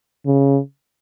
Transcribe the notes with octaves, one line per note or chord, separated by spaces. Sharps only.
C#3